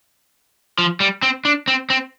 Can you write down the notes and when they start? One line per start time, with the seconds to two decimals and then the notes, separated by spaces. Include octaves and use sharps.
0.78 F3
1.00 G3
1.22 C4
1.45 D4
1.68 C4
1.90 C4